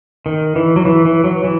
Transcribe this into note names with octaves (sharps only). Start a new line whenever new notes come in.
D#3
E3
F#3
E3
E3
F#3
E3